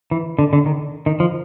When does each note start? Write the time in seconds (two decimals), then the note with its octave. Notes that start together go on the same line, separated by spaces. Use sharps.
0.11 E3
0.39 D3
0.53 D3
0.66 D#3
1.06 D#3
1.20 F3